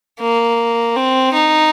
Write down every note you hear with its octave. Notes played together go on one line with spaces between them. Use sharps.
A#3
C4
D#4